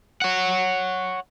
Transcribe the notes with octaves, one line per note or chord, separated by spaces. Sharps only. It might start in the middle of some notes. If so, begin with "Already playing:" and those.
C#5 F#5